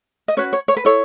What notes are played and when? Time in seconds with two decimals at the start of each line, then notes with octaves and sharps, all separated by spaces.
0.28 D#5
0.37 C#4 F#4 B4 C#5
0.53 C#5
0.68 C#5
0.77 B4
0.85 E4 A4 C#5